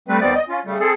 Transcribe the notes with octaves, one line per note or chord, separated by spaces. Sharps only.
G3 A3 C4 B4
D#2 G3 B3 C4 D5
D#5
C#4 F4
C#3 G3 A3
C4 G#4 A4